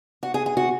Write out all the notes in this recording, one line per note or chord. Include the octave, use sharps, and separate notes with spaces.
F#4
G#4
G#4
F#4